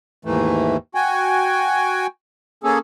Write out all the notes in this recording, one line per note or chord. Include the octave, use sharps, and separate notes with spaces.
D#2 G#2 E3 A3
F#4 G5 G#5
A#3 C#4 G#4 A4